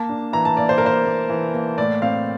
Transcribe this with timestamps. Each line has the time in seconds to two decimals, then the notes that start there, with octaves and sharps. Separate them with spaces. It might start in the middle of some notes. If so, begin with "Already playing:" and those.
Already playing: A#3 A5
0.09 D4
0.33 E3 A#5
0.45 A5
0.57 A#3 D5
0.69 C5
0.78 A#3 A#4
0.86 C5
1.06 A#3
1.29 E3
1.54 A#3
1.78 A2 D5
2.02 C4 F5